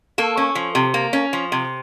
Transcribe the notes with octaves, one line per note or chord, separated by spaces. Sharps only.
A#3 A4
C#4
F3
C3
A#3
C#4
F3
C3